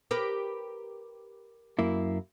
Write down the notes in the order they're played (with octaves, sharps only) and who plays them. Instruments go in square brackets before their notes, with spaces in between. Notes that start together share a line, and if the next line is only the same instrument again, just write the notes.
[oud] G4 A#4 B4
[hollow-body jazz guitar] F#2 A#3 E4